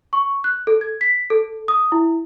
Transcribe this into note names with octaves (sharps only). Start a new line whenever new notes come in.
C#6
F#6
A4
G#6
B6
A4
D#6
E4